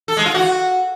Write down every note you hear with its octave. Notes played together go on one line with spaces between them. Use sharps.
A4
G#3
F4
F#4